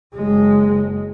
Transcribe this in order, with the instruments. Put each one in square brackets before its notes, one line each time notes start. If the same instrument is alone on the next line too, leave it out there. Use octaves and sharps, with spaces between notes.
[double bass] F#1 G#3